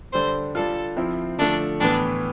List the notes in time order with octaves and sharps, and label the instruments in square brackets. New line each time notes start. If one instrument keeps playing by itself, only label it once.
[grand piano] D3 G3 D4 A4 [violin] C5
[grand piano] G3 D4 F4 [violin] A4
[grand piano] F3 C4 E4
[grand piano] D3 F3 A3 [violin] D4
[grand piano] A2 E3 B3 [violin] D4